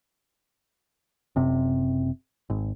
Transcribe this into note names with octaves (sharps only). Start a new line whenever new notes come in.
F#1 C3
G#1